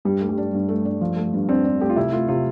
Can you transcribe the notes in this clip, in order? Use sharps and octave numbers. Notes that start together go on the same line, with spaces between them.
G2 G3
A3
G3
D4
G2
A3
D4
F3
A3
G2
C4 D4
D4
A3 G4
F4
C3 E4
A3 F4
C3 F4